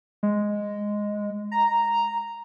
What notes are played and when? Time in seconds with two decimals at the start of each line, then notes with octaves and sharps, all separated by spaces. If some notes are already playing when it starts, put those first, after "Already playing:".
0.23 G#3
1.52 A#5